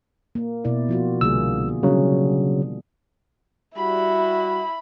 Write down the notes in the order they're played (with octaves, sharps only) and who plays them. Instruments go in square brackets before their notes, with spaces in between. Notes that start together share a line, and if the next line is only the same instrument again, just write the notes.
[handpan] A#3
B2 E4 D5
F3 F4 F#4
[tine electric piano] C2 E6 [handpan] D3 A#3 G#4
[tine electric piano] C#3 F#3 [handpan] G3 D4
[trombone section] G3 F#4 [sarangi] E4 [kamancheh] B5